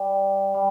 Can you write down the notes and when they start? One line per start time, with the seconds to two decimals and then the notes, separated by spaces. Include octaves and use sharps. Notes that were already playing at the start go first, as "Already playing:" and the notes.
Already playing: G3
0.54 G3